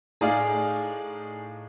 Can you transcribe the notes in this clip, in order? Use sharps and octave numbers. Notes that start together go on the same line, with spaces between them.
A2 D#4 G#4 D5 F5